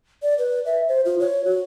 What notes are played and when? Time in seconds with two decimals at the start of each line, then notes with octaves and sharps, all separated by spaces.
0.22 D5
0.38 B4
0.65 E5
0.88 C5
1.05 F4
1.20 C#5
1.45 F#4